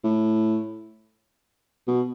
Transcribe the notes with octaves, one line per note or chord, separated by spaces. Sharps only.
A2
B2